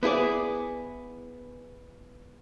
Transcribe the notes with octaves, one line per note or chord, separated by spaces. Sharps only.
B3 E4 G#4 D5